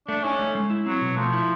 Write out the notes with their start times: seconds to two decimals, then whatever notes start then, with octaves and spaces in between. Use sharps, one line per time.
0.08 A3 D4
0.23 C#4 D#4
0.39 A3
0.55 G#3
0.70 E4
0.86 F#3 C4
1.01 B2
1.17 F3 A3
1.33 E4